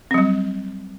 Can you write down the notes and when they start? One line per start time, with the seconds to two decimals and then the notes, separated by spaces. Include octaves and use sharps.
0.11 C4
0.14 F#3
0.18 G3